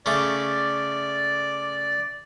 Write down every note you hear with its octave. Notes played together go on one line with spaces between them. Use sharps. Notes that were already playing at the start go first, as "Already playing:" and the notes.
C#3 A3 D5 D6